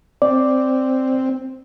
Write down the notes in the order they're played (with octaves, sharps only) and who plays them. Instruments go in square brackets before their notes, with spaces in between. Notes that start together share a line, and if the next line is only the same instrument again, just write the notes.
[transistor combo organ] C4 [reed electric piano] D5